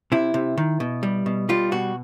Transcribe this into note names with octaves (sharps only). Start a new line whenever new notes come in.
C3 E4
C3
D#3
B2
G3
B2
G3 F4
B2 F#4